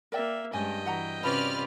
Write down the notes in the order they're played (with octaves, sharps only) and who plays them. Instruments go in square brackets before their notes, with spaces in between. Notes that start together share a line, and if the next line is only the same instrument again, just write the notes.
[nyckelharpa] A#3 E5 [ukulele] A#4 D5 G5
[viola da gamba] G2 G#3 [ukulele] C#4 G#5 [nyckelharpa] D#5 G5
[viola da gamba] E3 [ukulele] F#4 F#5 A#5
[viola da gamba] C3 C#4 F4 [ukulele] F#4 B5 [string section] B4 D5 F6